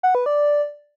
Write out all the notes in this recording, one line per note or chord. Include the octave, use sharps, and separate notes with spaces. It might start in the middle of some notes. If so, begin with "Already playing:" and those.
F#5
B4
D5